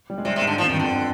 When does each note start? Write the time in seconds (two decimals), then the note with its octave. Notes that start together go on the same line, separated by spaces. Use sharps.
0.10 G3
0.18 G#3
0.25 C3 G3
0.36 C3
0.41 G#2
0.47 D3
0.58 G2 F3
0.67 F2 D#3
0.74 G2
0.79 F2 D3